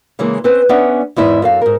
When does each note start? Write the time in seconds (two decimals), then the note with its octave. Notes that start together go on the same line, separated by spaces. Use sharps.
0.19 C#3 E3 G#3 A#3 E4
0.44 C4 C#4 B4 C5
0.69 B3 C#4 D4 D5 E5 F#5
1.16 E2 G#2 E4 D#5
1.42 F#2 A4 F5
1.62 G#2 A#4